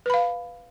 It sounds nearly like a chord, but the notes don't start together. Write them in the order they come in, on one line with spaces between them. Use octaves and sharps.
B4 B5 F5